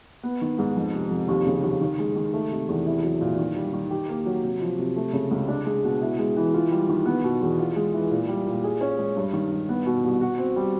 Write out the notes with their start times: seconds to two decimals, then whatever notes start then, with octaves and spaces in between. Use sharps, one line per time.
0.23 B3
0.42 D#3
0.58 G#2
0.76 F2
0.94 C3
1.11 F2
1.28 D#2
1.46 C#3
1.64 D#2
1.81 D#3
1.99 G#3
2.16 D#3
2.34 A3
2.52 C3
2.69 E2
2.87 E4
3.04 F#3
3.21 A#2
3.38 D#3
3.56 G3
3.73 D#3
3.90 G4
4.09 A#3
4.26 F#3
4.44 C3
4.61 F3
4.78 C3
4.96 A3
5.13 C#3
5.31 C#2
5.48 D4
5.66 G#3
5.84 B2
6.02 E4
6.19 G#3
6.37 E3
6.54 F4
6.71 G3
6.89 D#3
7.06 B3
7.24 B2
7.41 E2
7.58 F4
7.76 G#3
7.94 E3
8.11 A#2
8.28 G3
8.46 A#2
8.64 G#4
8.81 C#4
8.99 G#3
9.16 G2
9.33 D#3
9.51 G2
9.69 B3
9.86 B2
10.03 C2
10.21 F#4
10.38 C4
10.56 G3